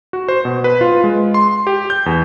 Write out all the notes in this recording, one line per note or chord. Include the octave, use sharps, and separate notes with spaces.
F#4
C5
B2
B4
F4
G#3
C6
G4
G6
E2